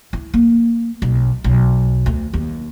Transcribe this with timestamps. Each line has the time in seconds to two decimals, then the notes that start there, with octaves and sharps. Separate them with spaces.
0.13 E4
0.34 A#3
1.02 B1
1.44 B1
2.06 D2
2.33 D#2